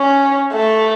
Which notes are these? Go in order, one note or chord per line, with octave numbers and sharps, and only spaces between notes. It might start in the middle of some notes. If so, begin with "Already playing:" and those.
Already playing: C#4
A3